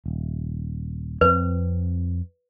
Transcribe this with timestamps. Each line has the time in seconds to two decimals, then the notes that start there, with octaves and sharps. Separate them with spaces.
0.06 D#1
1.21 F2 C4 B4